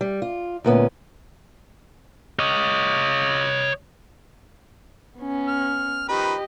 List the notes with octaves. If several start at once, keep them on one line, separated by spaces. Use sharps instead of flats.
G3
F4
D2 A#2 B3 C#4
C#5 D#5
B3 C#4
F6
D#3 F3 G4 B4 D#5